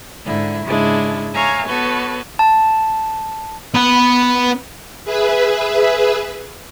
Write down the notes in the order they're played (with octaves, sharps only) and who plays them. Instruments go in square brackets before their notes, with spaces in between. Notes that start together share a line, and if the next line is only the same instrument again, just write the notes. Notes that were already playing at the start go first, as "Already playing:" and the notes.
[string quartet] G#2 D3 E4
G#2 C#3 G#3 D4 E4
C#5 E5 F5 G#5 A#5
B3 F#4 A4 B4 C#5
[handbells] A5
[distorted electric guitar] B3 B4
[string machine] G#4 B4 E5